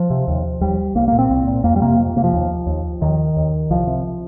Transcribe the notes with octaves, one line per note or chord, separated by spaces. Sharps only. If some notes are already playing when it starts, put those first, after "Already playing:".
Already playing: F3
C3
D#2
D#2 G3
C2 A#3
A#2 A#3
C4
C2
A#2
F2 A#3
G3
C3 A#3
F2
C3 A#3
F3
D#2
D#2
D#2 D#3
D#2
C2 F3
C3